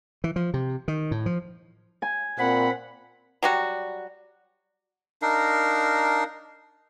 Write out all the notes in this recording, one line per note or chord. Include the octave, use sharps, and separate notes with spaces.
E3
F3
C3
D#3
A2
F3
G#5
A#2 C4 F#5 B5
F#3 G3 F#4
D4 D#4 A#4 F5